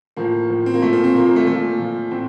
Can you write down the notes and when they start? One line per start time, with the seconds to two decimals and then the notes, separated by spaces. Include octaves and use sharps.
0.17 A2 F3 A#3
0.50 A2 F3
0.66 C4
0.74 A#3
0.82 A#2 F3 A3
0.93 C4
1.04 C4
1.15 A#2 A#3
1.19 F3
1.26 A#3
1.36 A3
1.47 A#2 F3 A3
1.79 A#2 F3
2.11 A2 C4